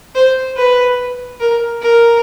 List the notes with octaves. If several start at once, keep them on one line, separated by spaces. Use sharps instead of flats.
C5
B4
A#4
A#4